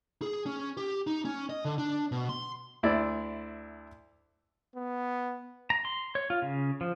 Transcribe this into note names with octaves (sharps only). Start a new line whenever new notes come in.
G#4
C#4
G4
D#4
C#4
D#5
D3
D4
B2
C6
D2 E4 D5
B3
A#5
C6
C#5
F4
C#3
F3